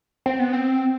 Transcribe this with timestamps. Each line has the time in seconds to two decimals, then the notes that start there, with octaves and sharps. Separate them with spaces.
0.26 C4
0.39 B3
0.53 C4